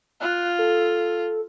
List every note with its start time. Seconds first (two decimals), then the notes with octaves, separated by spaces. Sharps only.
0.21 F4 F#6
0.59 A4